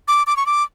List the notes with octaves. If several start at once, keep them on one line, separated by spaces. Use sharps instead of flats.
D6
D6
C#6
D6